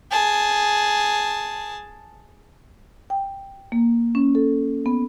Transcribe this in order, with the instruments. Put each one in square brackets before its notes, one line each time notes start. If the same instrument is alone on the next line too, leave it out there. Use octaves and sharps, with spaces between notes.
[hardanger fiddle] G#4 A5
[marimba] G5
A#3
C#4
A4
B3